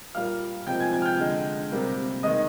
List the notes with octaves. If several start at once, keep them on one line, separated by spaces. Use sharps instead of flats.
A#2 G3 A#3 F5 F6
C3 F3 G#3 G5 G6
G#5 G#6
G#5 G#6
F6
G5 G6
D3 G#3
C3 G3 A#3
D#3 G#3 D#5 D#6